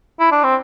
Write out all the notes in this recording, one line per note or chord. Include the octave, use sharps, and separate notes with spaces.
E4
D4
C4